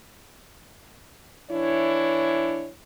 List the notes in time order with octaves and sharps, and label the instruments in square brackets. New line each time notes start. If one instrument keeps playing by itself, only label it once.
[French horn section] E3 D4 E4 C#5